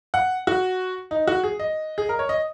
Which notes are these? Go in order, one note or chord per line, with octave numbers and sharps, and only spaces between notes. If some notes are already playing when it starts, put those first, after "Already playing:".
F#5
F#4
D#4
F#4
G#4
D#5
G#4
A#4
C#5
D#5